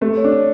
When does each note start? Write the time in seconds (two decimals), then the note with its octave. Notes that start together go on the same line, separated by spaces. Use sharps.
0.01 A3 G4
0.17 C#5
0.24 D4
0.33 C#5